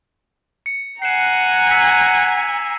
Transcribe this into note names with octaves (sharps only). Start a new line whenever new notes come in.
C#7
F#5 G#5 A#5 C7 E7
E6 B6 C#7